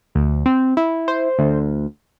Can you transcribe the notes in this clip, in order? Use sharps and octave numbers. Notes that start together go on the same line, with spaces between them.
D2
C4
E4
C5
D2